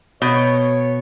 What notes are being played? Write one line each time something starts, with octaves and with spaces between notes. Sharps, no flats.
B2 C#5